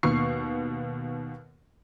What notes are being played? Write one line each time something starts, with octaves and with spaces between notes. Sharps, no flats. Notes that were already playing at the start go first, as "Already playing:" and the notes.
D#2 B2 C#6 C7